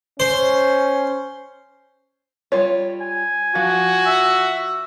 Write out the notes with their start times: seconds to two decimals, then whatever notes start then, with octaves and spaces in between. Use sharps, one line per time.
0.20 C#4 C5
2.52 G3 F4 C#5
3.01 G#5
3.55 F3 F#4
4.06 E5